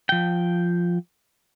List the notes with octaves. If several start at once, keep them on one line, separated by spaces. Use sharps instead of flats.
F3 G5